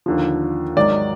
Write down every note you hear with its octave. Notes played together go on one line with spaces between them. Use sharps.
D#2 D3 F3
G#1 G#2 D#3 F#3 D5